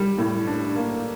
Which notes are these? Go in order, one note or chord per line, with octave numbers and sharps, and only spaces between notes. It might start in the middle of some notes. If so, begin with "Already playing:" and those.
Already playing: G3
A2
D4
A#3